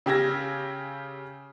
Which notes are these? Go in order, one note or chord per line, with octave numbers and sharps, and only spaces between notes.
C#3 G4 E6 G#6 A#6